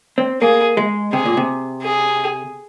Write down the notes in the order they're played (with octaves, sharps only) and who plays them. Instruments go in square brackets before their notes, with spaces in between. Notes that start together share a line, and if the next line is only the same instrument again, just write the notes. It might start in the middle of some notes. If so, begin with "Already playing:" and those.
[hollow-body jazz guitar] C4
[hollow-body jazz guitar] A#3 [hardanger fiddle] G#4
[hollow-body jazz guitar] G#3
[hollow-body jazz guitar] C3 [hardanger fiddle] G#4
[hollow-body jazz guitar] A#2
C3
[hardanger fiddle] G#4